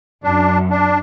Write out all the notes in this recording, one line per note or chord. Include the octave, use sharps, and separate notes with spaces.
F#2 D4
D4